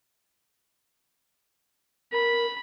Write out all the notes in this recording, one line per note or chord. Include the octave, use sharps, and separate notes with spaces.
A#4 B5